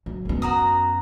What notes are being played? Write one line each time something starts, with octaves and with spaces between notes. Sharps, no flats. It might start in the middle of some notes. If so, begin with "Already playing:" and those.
F#3
F#2 B3
F#4 A#5 D#6